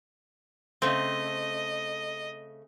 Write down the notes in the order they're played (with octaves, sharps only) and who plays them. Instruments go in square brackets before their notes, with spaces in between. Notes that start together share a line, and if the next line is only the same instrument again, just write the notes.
[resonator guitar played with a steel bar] C#3 A3 [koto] C4 [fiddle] D#5